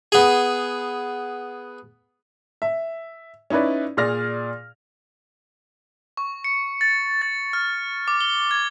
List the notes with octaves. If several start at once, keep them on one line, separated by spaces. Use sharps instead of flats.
B3 G#4
E5
C#4 D#4 E4 B4 D5
A#2 G#4 D5 F6 A#6
C#6
C#7
A6
A6
F6
D6
G7
G#6